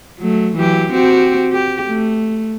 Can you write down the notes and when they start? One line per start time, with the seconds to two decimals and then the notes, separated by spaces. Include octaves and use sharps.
0.19 F#3 A3
0.56 E3 F#3 G4
0.92 C4 F#4 G4
1.53 G4
1.87 A3